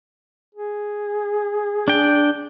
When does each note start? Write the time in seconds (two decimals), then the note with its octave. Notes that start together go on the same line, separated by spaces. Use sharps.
0.55 G#4
1.88 D4 G5